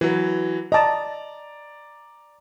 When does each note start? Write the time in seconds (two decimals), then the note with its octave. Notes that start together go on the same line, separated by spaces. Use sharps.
0.01 E3 F#3 B4
0.72 D5 D#5 A5 A#5